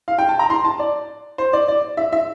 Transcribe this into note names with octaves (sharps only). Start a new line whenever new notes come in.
F5
G5
A5
A#5
C6
A5
D5
C5
D5
D5
E5
E5